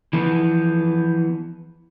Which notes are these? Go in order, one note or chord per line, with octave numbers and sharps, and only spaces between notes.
E3 F3 B3